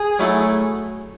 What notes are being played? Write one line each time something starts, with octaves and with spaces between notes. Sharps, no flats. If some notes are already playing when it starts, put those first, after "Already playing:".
Already playing: G#4
F#3 A3 E4 A4